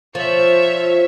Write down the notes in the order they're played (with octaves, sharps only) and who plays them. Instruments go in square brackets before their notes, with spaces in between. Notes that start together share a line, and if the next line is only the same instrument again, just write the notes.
[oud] F3 [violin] C#5 E5